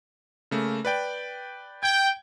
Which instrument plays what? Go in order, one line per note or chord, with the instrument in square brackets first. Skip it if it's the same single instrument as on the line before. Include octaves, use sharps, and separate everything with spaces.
[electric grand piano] C#3 A3 A#3
B4 D5 G5
[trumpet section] G5 [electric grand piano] G#6